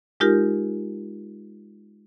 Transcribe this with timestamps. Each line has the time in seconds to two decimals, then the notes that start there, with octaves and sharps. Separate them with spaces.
0.20 G#3 D#4 F4 G4 A#4 G6